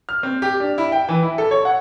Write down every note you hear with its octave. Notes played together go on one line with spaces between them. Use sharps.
F6
C4
G4
D4
E4
G5
E3
E4
A4
C#5
F#5